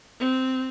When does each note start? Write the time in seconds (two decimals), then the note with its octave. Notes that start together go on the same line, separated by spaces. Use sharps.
0.20 C4